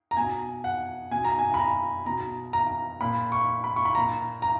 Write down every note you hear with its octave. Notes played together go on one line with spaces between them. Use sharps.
A#5
B2 G#5
F#5
B2 G#5
A#5
G#5
B5
A#5
B2 A#5
A#5
A#2 B5
C#6
B5
C#6
B5
A#2 A#5
A#5